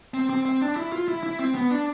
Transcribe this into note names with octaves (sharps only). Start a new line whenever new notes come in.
C4
C4
C4
D4
E4
F4
E4
E4
C4
B3
D4